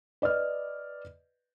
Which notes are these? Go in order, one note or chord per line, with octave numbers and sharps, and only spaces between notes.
B4 D5 D#5 F6